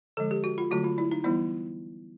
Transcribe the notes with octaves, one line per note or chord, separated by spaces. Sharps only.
D3 F3 G#3 A4
G4
F#4
F4
D3 F#3 A3 F#4
F4
E4
D#4
E3 G3 B3 E4